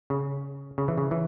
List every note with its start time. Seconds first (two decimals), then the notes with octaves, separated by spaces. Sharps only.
0.10 C#3
0.78 C#3
0.88 E3
0.98 C#3
1.11 E3